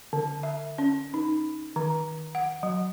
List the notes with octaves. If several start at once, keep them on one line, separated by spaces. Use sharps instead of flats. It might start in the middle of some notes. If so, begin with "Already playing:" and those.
D3
E5
C#4
D#4
D#3
F#5
F#3